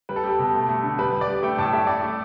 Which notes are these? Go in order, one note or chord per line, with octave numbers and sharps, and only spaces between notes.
G3 B4
A4
G3 G4
A4
B2
A3
A3
D3
G3 B4
G3
D5
G3
A3 G5
A2 A5
A3 E5
A3 D5
A3